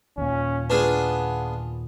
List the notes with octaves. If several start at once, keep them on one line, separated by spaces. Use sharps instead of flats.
D#2 A#2 C#4
B3 D4 F4 G#4 B4